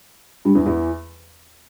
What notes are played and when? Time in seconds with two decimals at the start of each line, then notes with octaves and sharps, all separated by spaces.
0.45 G2 G3
0.55 E2 E3
0.65 E2 E3